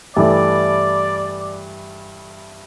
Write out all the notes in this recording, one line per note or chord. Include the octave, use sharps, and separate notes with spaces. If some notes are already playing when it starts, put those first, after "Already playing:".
G2 E3 A3 D5